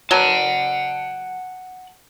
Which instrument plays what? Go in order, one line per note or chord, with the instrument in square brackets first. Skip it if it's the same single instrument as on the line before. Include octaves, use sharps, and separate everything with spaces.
[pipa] F#3 B3 A#4 [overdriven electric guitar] F#5 A5